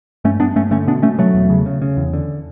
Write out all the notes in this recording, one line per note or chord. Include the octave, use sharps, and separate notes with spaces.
G2 A3 C#4
G2 B3 D4
G2 A3 C#4
D3 A3 C#4
B2 B3 D4
B2 A3 C#4
B2 F#3 A3
E2
C#3
C#3
C#3
E2
D3